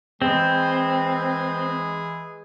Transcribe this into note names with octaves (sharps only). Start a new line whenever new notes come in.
E3 G#3 C4 G#4